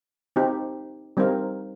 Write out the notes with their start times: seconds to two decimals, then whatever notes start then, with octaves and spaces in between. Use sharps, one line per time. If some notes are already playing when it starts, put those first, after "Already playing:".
0.36 C4 D#4 G4
1.17 G3 C4 D#4 A#4 F5